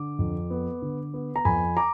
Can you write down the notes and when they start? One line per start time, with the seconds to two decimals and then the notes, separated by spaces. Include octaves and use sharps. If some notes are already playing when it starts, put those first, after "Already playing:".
Already playing: D3 D6
0.19 F2
0.50 B3
0.82 D3
1.14 B3
1.36 A#5
1.45 F2 G#5 B5
1.77 A#5 D6